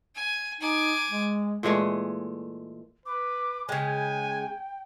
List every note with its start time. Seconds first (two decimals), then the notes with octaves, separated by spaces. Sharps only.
0.15 G#5
0.61 D#4 G#5 D6
1.10 G#3
1.63 A#2 E3 G#3 A3
3.06 B4 D6
3.69 C#3 G#3 G5 G#5